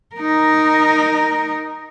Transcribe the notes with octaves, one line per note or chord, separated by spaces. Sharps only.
D#4 A#4